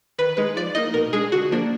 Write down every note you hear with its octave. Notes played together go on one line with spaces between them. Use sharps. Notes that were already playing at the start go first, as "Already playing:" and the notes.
D#3 B4
G#3 D#4 B4
F3 D5
A#3 D#4 D#5
B2 A#4
G#3 D4 G#4
D3 F#4
F3 A#3 D4